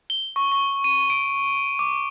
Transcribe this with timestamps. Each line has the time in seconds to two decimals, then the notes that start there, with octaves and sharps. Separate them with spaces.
0.10 G7
0.36 C#6
0.52 C#6
0.84 D#7
1.10 D7
1.79 D6